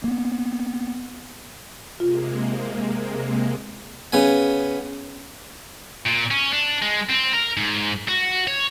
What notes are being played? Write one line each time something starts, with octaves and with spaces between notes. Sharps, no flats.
A#3 B3
C3 G#3 A#3 F4
C#3 B3 G#5
A#2
C#4
D4
G#3
C4
A#4
G#2
F#4
C#5